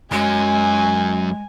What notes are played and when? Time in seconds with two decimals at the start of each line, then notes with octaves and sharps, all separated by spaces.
0.12 F#2 F#3 G#3 G#5